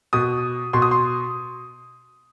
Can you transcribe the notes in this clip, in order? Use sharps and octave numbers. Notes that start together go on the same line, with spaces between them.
B2 D#6
B2 C6
D#6
C6